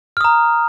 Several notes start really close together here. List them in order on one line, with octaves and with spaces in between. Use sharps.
F6 D#6 A#5